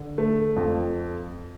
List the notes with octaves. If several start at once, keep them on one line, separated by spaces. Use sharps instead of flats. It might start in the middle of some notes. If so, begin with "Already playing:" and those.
Already playing: D3
A3
F2